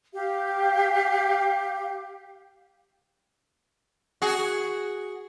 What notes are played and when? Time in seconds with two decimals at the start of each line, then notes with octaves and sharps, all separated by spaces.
0.13 G4 F5
4.22 F#4 G#4